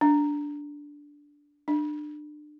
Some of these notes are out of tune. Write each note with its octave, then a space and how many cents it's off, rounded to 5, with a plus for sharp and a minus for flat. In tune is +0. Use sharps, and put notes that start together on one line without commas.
D4 -10
D4 +30